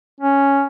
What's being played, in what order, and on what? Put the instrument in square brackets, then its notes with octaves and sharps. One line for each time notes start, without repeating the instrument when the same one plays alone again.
[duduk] C#4